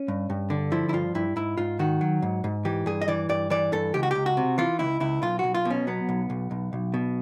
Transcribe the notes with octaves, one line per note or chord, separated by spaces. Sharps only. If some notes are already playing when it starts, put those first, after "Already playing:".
Already playing: C#4
G2
G2
D3
F3 E4
E4
G2 F4
G2 E4
G#2 E4
G#2 F4
D#3 F#4
F#3
G#2
G#2
E3 G4
G2 G#4
D#5
E3 D5
G2 D5
E3 D5
G2 A4
C#2 G4
F#4
C#2 G4
F#4
C3
E3 F4
C#2 E4
C#2 E4
B1 F4
B1 F#4
F4
B2
C#4
F#3 B3
B1
B1
B1
B1
B2